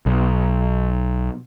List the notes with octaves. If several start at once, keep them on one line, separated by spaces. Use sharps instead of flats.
B1